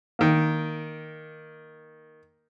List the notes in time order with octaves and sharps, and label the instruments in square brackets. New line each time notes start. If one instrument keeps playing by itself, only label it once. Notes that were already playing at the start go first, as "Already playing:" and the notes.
[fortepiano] D#3 A#3